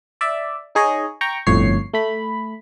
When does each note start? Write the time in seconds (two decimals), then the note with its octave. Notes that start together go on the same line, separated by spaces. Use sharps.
0.21 D5 E5
0.75 D#4 G#4 C#5 D#5
1.21 G5 A#5 C#6
1.47 G1 F2 A2 C#5 C7
1.94 A3 B5